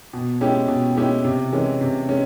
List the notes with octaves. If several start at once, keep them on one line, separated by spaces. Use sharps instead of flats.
B2
G#3 C#4 E4 G4
B2
G#3 C#4 E4 G4
C3
E3 G#3 C#4
C3
G#3 C#4